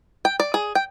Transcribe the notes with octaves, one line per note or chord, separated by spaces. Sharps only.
G5
D5
G#4
G5